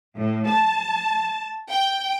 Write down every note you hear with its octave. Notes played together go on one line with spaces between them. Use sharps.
A2
A5
G5